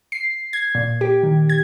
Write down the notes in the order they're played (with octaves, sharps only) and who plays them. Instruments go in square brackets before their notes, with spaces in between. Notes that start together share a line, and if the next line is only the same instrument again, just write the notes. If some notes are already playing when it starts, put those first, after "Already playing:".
[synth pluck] C7
G#6
A#2
G4
D#3
G#6